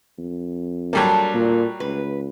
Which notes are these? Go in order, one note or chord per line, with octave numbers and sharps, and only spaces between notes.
F2
F#3 G3 A#3 D4 A4
A#2
C#2 B4